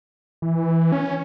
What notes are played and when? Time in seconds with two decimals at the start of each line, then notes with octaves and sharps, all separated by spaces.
0.42 E3
0.92 C#4